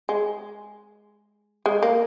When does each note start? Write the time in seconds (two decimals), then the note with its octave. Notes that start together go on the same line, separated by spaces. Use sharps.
0.09 G#3
1.66 G#3
1.83 A#3